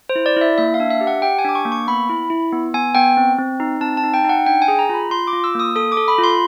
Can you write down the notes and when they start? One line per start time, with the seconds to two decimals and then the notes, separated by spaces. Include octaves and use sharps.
0.09 C5
0.16 E4
0.26 D5
0.36 E4 E5
0.58 A#3 E5
0.74 F5
0.80 D4
0.90 E5
1.01 G4
1.07 F#5
1.22 G4 G5
1.39 G#5
1.45 D4 D6
1.55 C#6
1.65 A#3
1.72 C#6
1.87 B3 B5
2.09 E4
2.30 E4
2.52 B3
2.74 B3 G#5
2.95 B3 G5
3.17 C4
3.38 C4
3.60 D#4
3.81 C4 A5
3.97 A5
4.04 D#4
4.14 G5
4.24 D#4 F#5
4.46 D4 G5
4.62 G#5
4.68 G#4
4.79 A#5
4.89 F4 B5
5.10 F4 C6
5.27 D6
5.33 F4
5.44 E6
5.55 A#3 D#6
5.76 A4 D#6
5.92 D6
5.97 A4
6.08 B5
6.18 F4
6.24 C6